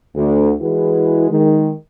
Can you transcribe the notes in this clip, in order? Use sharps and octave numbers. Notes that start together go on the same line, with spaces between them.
D2
E3 G#3 E4 F#4 G#4 B4
D#3 G#3